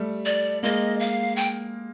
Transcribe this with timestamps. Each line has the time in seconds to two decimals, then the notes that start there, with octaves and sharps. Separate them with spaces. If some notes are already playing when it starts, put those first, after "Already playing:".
Already playing: G3 A3
0.25 D5
0.63 G#3 A#3 D#5
1.00 F5
1.36 G5